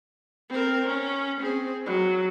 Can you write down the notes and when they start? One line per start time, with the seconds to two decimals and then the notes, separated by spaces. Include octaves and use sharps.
0.49 C4 A#4
0.86 C#4
1.41 C4 G#4
1.86 F#3